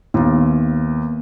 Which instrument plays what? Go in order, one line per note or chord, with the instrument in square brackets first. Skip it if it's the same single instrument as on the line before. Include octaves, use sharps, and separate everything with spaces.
[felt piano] D#2 [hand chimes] A#3 B3